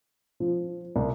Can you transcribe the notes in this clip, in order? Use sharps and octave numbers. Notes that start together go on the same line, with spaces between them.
F3
C2